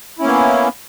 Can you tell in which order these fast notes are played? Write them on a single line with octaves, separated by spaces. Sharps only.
E4 C#4 A#3 B3